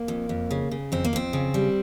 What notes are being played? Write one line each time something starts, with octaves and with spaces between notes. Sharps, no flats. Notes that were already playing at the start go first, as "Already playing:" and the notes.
Already playing: A#3
F2
F2
C#3
C#3
F2 C4
A#3
F2 C4
C#3
G3